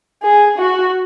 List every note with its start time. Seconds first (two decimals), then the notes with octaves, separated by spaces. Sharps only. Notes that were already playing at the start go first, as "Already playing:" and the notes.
0.23 G#4
0.58 F#4